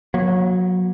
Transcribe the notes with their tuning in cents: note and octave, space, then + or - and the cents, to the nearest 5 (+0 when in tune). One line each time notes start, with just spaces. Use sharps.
F#3 -20 A#3 +30